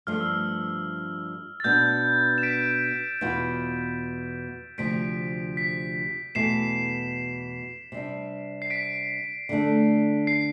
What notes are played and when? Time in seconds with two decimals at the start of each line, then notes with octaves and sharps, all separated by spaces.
0.07 G2 F3 A3 F6
0.20 E6
0.32 F6
1.60 A6
1.64 B2 B3 D4 G6
2.38 E7
2.43 B6 D7
3.21 E2 B2 B3 F4
4.78 D2 C3 F3 C4 B6 D7
5.57 B6
6.35 E2 B2 A3 C7 E7
7.92 C3 G3 D4
8.62 C7
8.70 B6 D7
9.49 D3 A3 D4
10.27 C7